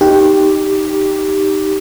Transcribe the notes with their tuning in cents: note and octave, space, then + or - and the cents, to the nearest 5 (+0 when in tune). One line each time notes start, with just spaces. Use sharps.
D#4 +0 G4 -5